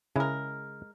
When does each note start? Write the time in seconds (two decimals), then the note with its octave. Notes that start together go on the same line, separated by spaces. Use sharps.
0.16 C#3 G#3 E4 A#4